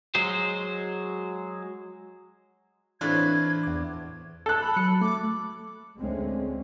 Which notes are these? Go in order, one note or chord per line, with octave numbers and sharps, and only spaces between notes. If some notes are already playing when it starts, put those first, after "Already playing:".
F#3 G#3 C5
A2 E3 C4 D4 F4 B4 G#6
E2 D6
A4 F#6
B5
F#3 C#7
A3 D6
D2 G#3 C4 C#4